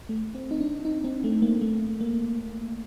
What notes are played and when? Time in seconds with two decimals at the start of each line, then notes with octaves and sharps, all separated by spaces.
0.09 A3
0.35 C4
0.51 D#4
0.61 D4
0.85 D#4
1.04 C4
1.24 A3
1.42 A#3
1.61 A3
2.01 A#3